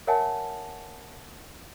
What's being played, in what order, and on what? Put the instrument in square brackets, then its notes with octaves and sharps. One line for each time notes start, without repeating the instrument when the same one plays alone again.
[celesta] A#4 C#5 E5 F#5 G#5 A5